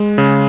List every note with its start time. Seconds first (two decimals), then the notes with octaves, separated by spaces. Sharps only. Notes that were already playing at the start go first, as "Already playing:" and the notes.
Already playing: G#3
0.18 C#3